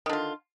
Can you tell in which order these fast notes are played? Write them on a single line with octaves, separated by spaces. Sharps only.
D#3 D3 F4